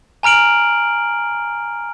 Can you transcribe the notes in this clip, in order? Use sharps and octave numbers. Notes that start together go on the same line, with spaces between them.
G#5 A#5 F6 D7 F#7